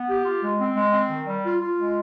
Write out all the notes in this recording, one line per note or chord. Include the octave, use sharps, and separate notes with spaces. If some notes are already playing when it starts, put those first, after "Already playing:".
Already playing: B3
G4
F4
G#3
C4
G#3
C4
D#3
G3
F4
F4
G#3